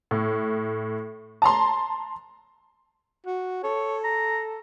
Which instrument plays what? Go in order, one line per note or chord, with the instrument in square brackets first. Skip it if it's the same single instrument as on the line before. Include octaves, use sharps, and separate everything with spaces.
[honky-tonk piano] A2
A5 A#5 C6
[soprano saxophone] F#4
[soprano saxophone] A4 [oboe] C#5
[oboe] A#5